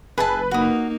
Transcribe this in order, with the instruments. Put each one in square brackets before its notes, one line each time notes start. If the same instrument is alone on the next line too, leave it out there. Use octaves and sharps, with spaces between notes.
[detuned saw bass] F#1 [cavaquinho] G#4 E5 A5 [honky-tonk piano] B4
[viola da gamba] A#3 D#4 [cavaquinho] F#4 D#6